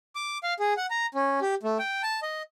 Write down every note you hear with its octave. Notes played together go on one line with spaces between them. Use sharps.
D6
F5
G#4
F#5
A#5
C#4
G4
A3
G5
A5
D#5